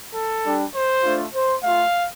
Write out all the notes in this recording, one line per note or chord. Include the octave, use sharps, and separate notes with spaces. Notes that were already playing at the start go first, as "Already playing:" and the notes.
A4
G3 D4 G4
C5
A3 D4 F4
C5
A3 F4 F5